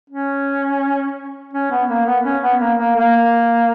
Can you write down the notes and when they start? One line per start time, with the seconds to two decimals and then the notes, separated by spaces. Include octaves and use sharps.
0.10 C#4
1.53 C#4
1.71 B3
1.89 A#3
2.06 B3
2.24 C#4
2.42 B3
2.60 A#3
2.78 A#3
2.96 A#3